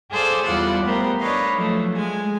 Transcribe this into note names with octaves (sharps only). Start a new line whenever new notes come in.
G#4 A4 C5 D5 F5
E2 G3 F4 D5 F#5
G3 A3 B3 G4 A#4 C5
D4 B4 C#5 D#5 F5
F3 F#3 A3
G#3 G#5